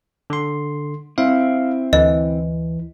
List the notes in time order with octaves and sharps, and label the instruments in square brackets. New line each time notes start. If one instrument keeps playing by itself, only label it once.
[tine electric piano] D3 C6
[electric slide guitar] C4 E4 [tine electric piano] F5
[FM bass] D2 [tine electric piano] E3 [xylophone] D#5